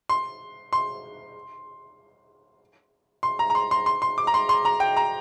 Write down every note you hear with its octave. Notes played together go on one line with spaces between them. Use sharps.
C6
C6
C6
A#5
A#5
C6
C6
C6
C6
D6
A#5
C6
C6
A#5
G5
A#5